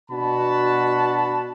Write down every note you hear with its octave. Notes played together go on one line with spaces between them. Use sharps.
B2 D4 F#4 A5 B5